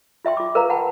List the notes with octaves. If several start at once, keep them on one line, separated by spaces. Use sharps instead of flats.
F4 E5 G5 C6
F4 D6
A#4 B4 F5 A#5
F#5 G5 A5 B5